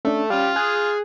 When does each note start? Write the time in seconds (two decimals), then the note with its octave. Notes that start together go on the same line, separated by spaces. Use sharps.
0.05 A3 C#4 D4 A4
0.30 G3 C#4 F4 F5
0.56 G#4 F#6